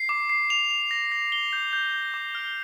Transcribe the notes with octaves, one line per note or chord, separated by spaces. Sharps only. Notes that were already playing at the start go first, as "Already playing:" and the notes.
Already playing: C7
D6
C7
F7
F7
A#6
A#6
G7
G6
G6
G6
D6
F6